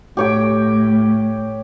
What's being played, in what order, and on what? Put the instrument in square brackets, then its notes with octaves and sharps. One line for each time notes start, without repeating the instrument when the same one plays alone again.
[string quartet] A2 [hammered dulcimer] G4 C#5 G5